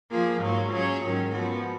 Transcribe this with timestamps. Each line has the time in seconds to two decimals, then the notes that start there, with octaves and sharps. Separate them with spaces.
0.12 F3 A#3 F4 G#4
0.42 G#2 F#3 A#3 F4
0.73 F#3 C#4 G#4 C#5
1.04 G#2 D#3 F#3 C#4
1.34 F3 B3 F#4